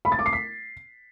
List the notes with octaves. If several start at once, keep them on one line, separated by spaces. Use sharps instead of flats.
B5
A6
D6
C7
B6